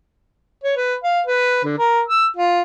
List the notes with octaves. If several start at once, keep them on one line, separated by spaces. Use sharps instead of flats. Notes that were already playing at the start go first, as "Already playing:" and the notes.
C#5
B4
F5
B4
D3
A#4
E6
F4